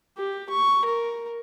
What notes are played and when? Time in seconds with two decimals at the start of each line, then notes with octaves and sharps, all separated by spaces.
0.18 G4
0.50 C#6
0.85 A#4